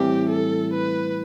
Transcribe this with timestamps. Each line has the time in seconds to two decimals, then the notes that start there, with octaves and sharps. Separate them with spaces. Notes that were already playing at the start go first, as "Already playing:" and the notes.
Already playing: A2 E3 G3 C4 G4
0.30 A4
0.74 B4